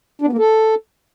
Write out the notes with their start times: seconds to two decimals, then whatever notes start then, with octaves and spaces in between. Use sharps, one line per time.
0.22 D4
0.27 B3
0.33 A#3
0.38 A4